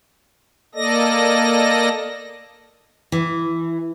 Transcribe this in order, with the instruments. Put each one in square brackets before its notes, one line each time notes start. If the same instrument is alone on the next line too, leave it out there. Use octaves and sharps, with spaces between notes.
[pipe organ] A#3 A4 D5 D#5 A#6
[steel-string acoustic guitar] E3